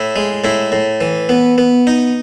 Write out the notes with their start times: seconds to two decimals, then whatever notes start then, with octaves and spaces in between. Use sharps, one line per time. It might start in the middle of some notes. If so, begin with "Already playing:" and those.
Already playing: A2 E4
0.16 G#3
0.44 A2 E4
0.72 A2
1.01 E3
1.29 B3
1.58 B3
1.87 D#4